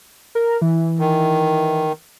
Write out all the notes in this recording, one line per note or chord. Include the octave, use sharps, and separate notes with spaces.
A#4
E3
D#3